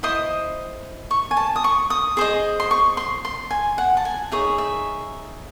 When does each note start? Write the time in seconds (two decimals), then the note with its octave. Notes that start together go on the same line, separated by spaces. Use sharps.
0.03 E4 C5 D#5 D#6
1.11 C#6
1.31 G#5
1.37 A5
1.56 D#6
1.64 C#6
1.90 D#6
2.17 G#4 C5 D#5
2.60 C6
2.71 C#6
2.97 C6
3.25 C6
3.51 G#5
3.78 F#5
3.97 A5
4.05 G#5
4.31 D#4 G#4 C#5 E5
4.58 E5